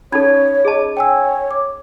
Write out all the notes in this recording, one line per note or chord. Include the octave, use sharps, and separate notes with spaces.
C#4 D#4 A4 C#5 B5 G#6
G#4 D#5 A5
C#5 G5 G#5 E6
D6